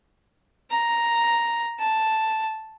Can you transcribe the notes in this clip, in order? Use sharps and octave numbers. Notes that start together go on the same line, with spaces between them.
A#5
A5